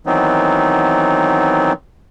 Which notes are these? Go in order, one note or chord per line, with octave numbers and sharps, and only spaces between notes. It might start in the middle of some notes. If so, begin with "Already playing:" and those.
D#3 E3 F#3 B3 C4 D#4